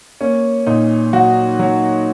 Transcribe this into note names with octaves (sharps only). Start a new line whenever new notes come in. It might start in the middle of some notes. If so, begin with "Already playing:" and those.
A#3 C#4
A#2 D#4
F#3 F#4
F#3